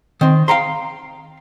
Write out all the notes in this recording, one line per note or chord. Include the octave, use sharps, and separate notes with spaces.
D#3 C4
F5 G5 A#5 C6